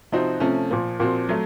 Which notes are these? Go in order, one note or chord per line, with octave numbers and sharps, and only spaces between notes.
C3 F3 C4 D#4 F#4
C3 F3 A3 C#4
A#2 F3 A#3
A#2 F3 C4 F#4
F#3 A3